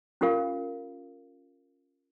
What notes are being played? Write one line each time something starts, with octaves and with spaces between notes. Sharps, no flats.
C#4 F4 G4 A#4 F5